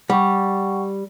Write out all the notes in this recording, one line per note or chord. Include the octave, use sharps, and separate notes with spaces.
G3 F#5 G5 C#6